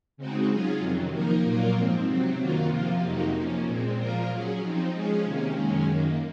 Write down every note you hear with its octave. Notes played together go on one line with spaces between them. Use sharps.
C#3 G#3 C4 D#4 F#4
F#3 C#4 F4 G#4
F2 C3 D#3 F#3
F3 A#3 D#4 A#4
A#2 F#3 A#3 F4 A#4
G#2 F3 C4
C3 F#3 C4
F#2 D#3 F#3 A#3 F4
C3 F3 A#3 F4
F2 C3 F#3 A#3 D#4
F3 A#3 C#4
A#2 G#3 C4
A#2 F3 A#3 F4 A#4
F#3 C#4 G#4
F3 C4 D#4
F3 G#3 C#4 G#4
C3 D#3 A#3 C#4
F#2 D#3 G#3 C#4
F#2 D#3 A#3